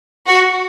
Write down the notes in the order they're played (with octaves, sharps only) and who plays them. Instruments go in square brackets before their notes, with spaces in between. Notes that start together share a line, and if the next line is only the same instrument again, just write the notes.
[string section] F#4